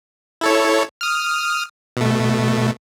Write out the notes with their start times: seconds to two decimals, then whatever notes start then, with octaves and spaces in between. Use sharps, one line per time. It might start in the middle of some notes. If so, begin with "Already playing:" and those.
0.41 E4 A4 C#5
1.01 D#6 F6
1.97 B2 A3